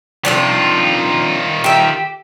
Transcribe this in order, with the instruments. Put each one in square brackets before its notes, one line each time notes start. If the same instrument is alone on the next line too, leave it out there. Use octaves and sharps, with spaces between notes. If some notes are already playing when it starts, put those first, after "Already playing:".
[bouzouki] C3 F3 D4 [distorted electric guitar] D#3 F4
[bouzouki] G4 E5